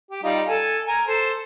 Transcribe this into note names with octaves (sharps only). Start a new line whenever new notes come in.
G4
G3 D#4 F4
A4 G#5
A#4 G#5
A4 C5